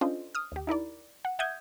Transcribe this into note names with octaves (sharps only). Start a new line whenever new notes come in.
C#4 D4 F4 A4 C5 D#5
D#6 F6
D#2 G4
D#4 E4 A#4 D5
F#5
E5 F#5 D#6 G6 G#6